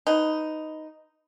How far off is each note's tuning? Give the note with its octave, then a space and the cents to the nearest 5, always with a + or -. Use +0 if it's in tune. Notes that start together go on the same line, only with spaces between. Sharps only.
D#4 +0 B4 +15